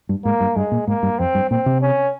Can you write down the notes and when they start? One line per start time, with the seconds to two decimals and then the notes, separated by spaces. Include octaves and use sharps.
0.09 G2
0.25 G#2 A#3
0.40 G2
0.56 G2 G#3
0.72 A#2
0.87 G#2 A#3
1.03 G2
1.19 F2 C4
1.35 G2
1.50 A#2 C4
1.66 C3
1.82 C#4